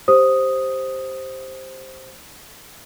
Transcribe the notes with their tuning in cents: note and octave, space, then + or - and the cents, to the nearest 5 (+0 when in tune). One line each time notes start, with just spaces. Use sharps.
G4 +0 C5 +5 D#6 +0